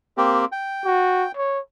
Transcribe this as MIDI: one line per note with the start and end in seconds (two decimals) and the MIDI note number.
0.17 0.45 58
0.17 0.45 60
0.17 0.45 67
0.52 1.32 79
0.85 1.26 66
1.36 1.59 73